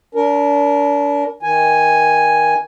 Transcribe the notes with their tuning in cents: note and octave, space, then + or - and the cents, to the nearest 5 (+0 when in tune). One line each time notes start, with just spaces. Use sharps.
D4 -35 A#4 +0
D#3 +20 G#5 +0